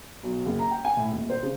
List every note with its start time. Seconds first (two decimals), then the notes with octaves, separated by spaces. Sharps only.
0.23 B1
0.46 F#1
0.59 A#5
0.71 G5
0.85 G#5
0.97 A2
1.12 D#1
1.30 C5
1.43 C#3